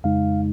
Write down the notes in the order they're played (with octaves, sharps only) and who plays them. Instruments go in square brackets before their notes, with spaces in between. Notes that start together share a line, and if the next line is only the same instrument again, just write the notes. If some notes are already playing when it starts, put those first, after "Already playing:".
[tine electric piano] F2 C#3 G#3 D#4 F5